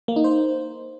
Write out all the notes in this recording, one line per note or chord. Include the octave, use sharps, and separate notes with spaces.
A#3
D#4
C5